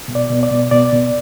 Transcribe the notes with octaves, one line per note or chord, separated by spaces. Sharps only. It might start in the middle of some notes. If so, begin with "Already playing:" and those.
B2
D5
B2
D5
B2
B2 D5
B2